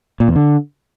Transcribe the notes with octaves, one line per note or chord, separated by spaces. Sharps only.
A#2
E2
D3